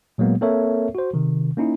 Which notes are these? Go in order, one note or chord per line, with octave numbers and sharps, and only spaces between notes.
A#2 F#3 G#3 A#3 B3
A#3 C4 A4 A#4 C#5 E5
F#4 C5
C3 D#3
A#3 C#4 D#4 E4